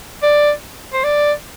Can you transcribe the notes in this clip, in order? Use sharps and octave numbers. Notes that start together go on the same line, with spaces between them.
D5
C5
D5